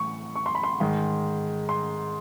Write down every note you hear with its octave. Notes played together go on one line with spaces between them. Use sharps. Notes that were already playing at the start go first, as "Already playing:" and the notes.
Already playing: A2 E3 C#6
C#6
C6
B5
C6
G#2 D#3 G#3
C6